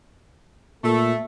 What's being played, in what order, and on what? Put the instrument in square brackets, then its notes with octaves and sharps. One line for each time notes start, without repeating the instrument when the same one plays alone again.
[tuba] A#2 [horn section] A3